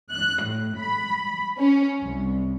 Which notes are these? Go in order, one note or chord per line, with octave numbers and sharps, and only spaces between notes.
F#6
A2
B5
C#4
C2